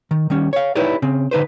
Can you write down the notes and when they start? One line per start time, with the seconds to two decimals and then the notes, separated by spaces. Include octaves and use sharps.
0.11 D#3
0.30 D#3 G3 C#4
0.53 C#5 F5
0.75 D#4 E4 G4 B4 C#5 D5
1.02 C#3 C4
1.31 D3 D#4 B4 C5